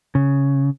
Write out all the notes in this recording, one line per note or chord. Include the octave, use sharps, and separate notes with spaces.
C#3